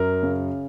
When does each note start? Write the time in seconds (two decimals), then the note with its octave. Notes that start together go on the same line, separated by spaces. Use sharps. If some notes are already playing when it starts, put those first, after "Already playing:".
Already playing: F#2 A#4
0.23 C#3